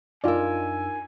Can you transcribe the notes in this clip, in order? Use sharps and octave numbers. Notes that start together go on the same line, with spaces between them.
F#2 D4 D#4 F4 A#4 D5 G#5 E6